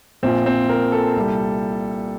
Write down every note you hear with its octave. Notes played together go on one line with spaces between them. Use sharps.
A#1 A#2 F3 C4
C4
A#4
A4
C2 A#2 G3